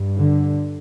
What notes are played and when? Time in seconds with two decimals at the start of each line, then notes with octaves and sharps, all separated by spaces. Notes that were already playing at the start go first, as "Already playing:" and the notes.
Already playing: G2
0.19 D3